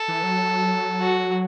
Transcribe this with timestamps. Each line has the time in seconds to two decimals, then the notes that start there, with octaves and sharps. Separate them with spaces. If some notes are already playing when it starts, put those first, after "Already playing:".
Already playing: A4
0.08 E3
0.23 F#3
1.01 F#4